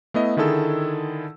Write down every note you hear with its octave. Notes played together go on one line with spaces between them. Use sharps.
A3 B3 E4 D#5 E5
D3 D#3 E4 G#4 A4 E6